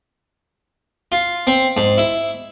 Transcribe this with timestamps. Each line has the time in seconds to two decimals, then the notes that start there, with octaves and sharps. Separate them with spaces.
1.12 F4
1.47 C4
1.77 G#2
1.98 E4